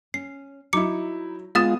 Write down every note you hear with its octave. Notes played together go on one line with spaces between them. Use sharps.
C#4 C7
F#3 D#4 E4 D6 C#7
G#3 B3 F4 F5 D#6 A6 E7